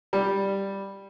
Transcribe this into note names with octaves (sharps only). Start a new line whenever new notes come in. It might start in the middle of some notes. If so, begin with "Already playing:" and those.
G3